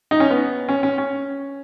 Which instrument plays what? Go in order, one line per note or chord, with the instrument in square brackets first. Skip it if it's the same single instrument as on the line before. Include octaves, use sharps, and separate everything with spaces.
[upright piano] D#4
C#4
B3
C#4
C#4
C#4